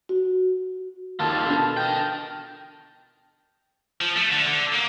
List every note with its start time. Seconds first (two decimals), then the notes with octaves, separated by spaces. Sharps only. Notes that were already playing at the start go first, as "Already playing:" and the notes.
0.09 F#4
1.20 D#2 F4 A4 A5
1.46 B2 D3
1.77 A#4 G5
4.01 F3
4.16 A3
4.32 D3
4.47 D3
4.74 A#3